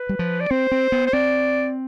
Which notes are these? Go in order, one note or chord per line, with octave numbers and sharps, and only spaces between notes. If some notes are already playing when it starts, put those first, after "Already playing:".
Already playing: B4
G3
F3
D5
C4 C5
C4
B3
C5
C4 D5